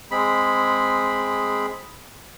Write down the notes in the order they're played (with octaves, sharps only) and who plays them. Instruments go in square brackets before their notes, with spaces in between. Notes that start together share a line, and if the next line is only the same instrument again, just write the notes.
[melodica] G#3 C4 G#4 B5